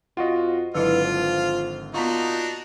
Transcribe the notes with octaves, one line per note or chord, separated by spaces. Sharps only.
F2 F4 F#4 D#5 F#5
G#1 D3 F#3 E4 F4 B4 D#5
F3
A#2 B3 D4 D#4 F4 F#4 A#5 C#6